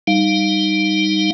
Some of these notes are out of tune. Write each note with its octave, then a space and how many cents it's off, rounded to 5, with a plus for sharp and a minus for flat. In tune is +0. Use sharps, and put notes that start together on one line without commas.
G3 +0 D#4 +0 F5 +0